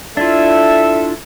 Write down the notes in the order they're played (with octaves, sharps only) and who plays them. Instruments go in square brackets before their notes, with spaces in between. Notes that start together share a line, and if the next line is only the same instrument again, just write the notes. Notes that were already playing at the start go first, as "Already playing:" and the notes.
[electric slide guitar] D4 E4 F4 [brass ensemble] A4 E5